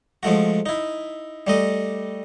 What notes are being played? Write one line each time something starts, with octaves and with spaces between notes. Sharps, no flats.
F3 G#3 A3 F#4
D#4 E4
G3 A3 D#5